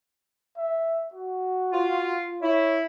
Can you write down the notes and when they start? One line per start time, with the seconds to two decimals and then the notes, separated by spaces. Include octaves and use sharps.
0.57 E5
1.14 F#4
1.72 F4
2.42 E4 C#5